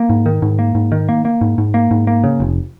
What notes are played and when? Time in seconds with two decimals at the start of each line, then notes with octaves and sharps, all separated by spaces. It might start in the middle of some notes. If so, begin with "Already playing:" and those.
Already playing: A#3
0.09 G#2
0.26 D#3
0.42 G#2
0.59 A#3
0.75 G#2
0.92 D#3
1.09 A#3
1.25 A#3
1.41 G#2
1.58 G#2
1.74 A#3
1.91 G#2
2.07 A#3
2.24 C#3
2.40 F1